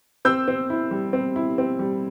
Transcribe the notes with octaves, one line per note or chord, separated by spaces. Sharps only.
C4 E6 G6
C4
E4
G3
C4
E4
C4
G3